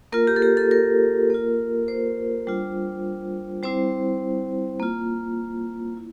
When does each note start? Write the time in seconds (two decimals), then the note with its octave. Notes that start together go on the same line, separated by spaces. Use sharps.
0.12 A#3 F4 A#4
0.27 G4
0.36 A4
0.42 G4
0.57 A4
0.71 A#4
1.30 A#3 F4
1.88 C5
2.47 G3 D4 F4
3.63 G3 C4 E4 C5
4.80 A#3 F4
5.97 E4